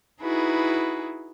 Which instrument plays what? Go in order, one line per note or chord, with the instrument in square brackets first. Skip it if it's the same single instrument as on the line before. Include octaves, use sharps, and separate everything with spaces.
[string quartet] D#4 E4 F#4 G#4 B4